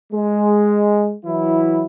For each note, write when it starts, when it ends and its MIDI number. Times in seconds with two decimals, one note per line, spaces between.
0.12 1.12 56
1.24 1.85 52
1.24 1.85 54
1.24 1.85 64